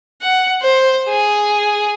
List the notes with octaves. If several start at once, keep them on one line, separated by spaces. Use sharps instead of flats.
F#5
C5
G#4